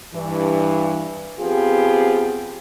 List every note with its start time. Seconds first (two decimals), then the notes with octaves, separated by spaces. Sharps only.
0.15 G2 E3
1.39 F3 B3 C4 F4 G4 G#4